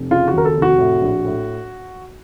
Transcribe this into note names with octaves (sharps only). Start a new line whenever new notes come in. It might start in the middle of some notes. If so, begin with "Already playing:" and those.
Already playing: F1
C#3 F4
F#4
D#2 A#4
A4
F1
F#4
A2
A#1
A2